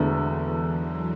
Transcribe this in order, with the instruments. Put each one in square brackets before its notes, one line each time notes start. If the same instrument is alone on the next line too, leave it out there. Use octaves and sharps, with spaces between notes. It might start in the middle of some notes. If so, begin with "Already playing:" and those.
Already playing: [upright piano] E1 E2 D3 A3 [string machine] E3
[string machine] F#3